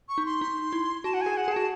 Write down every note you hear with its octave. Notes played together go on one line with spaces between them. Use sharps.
C#6
D#4
C6
D#4
E4
F#4 A5
F#5
G#5
G#4
F#5
G#4
F#4 A5